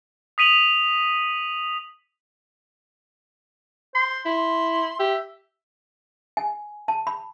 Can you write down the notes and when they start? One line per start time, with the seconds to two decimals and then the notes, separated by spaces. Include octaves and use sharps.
0.38 D#6 B6 D#7 F7 F#7
3.95 C5 C6
4.25 E4 C6
4.99 G4 E5
6.37 G#5
6.88 A5
7.07 B5